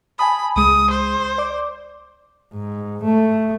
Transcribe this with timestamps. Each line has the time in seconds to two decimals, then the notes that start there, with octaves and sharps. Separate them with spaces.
0.19 G#5 A5 B5 D#6
0.56 C#2 G#3 D#6
0.90 C5
1.38 D5 D6
2.54 G#2
3.05 A3